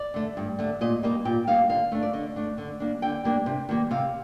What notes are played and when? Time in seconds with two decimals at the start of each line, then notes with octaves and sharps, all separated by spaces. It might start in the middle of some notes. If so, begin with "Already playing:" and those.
Already playing: D5
0.14 D3 A3
0.37 G2
0.59 D3 A3
0.81 A#2 D#5
1.03 G3 A#3 D#4
1.25 A#2 G5
1.47 G3 A#3 D#4 F5
1.69 D3 F5
1.92 A3 D4
2.02 D5
2.13 D3 D#5
2.36 A3 D4
2.58 D3
2.80 G3 A#3 D4
3.02 D3 G5
3.24 G3 A#3 D4
3.46 C3
3.69 D#3 G3 A#3
3.91 C3 F5